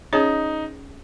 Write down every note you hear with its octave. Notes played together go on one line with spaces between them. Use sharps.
C#4 D#4 G#4 C#5